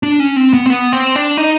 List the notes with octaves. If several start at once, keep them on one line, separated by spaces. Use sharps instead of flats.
D4
C#4
C4
B3
C4
B3
C4
D4
D#4